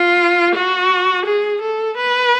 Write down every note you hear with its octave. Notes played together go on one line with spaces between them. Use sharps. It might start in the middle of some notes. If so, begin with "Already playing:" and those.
Already playing: F4
F#4
G#4
A4
B4